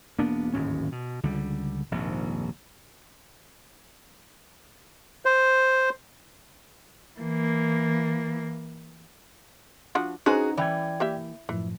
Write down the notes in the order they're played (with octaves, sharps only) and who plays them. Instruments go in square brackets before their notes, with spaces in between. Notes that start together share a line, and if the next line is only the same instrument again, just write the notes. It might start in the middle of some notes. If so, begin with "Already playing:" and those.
[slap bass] E1 A#3 B3 D4
D1 G#1 D#2 C#4
B2
C#2 D3 G3
D#1 A#1 G#2 C3
[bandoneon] C5
[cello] E3 A#3
[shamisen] F3 D4 F#4
[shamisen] C#4 B4 C5 [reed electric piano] D#4 A#5 [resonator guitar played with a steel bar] F#4 G#4
[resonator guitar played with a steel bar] E3 [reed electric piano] D5 G5 G#6
[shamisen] A#3 G4 E5
[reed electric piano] F#2 A2 F3 [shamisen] E3